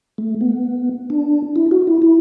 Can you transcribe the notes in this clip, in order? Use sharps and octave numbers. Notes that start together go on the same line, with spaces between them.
A3
B3
D4
E4
F#4
E4
E4